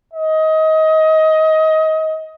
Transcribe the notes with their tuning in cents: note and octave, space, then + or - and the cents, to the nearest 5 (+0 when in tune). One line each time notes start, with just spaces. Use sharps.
D#5 +25